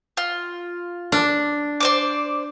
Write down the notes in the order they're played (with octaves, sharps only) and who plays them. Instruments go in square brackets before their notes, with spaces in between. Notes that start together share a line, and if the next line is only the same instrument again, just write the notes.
[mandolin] F4
[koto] D4
[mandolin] C5 D5 D6